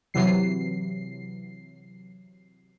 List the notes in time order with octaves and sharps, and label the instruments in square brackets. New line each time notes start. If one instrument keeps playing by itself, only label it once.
[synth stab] C3 E3 F#3 C7